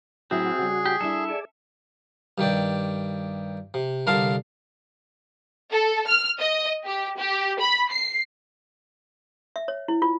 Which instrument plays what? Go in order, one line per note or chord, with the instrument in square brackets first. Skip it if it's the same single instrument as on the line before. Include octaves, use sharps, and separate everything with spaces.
[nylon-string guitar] A2 F#3 E4 [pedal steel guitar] C4 [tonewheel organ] F#4 [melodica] G#4
[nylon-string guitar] C#3 G3
[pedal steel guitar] G4
[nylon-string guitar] G3 D4 E4 [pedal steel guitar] A4 E5
[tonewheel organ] G#4 D5
[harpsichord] G2 D#3 G4 D5
C3
C2 D3 A#4 F5 A5 C6
[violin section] A4
F6
D#5
G4
G4
B5
C7
[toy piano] E5
C#5
E4
F4